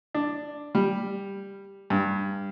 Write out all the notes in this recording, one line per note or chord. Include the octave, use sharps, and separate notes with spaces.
D4
G3
G2